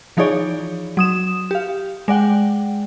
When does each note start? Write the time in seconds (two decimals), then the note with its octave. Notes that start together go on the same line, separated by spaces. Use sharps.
0.17 E3 F3 D#4 G#4 C#5 D5
0.97 F#3 D#6 E7
1.51 G4 F5
2.08 G#3 D5 F#5 G5